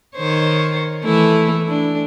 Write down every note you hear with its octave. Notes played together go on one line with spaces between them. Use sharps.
D#3 C5 C#5
E3 A3 E4
D4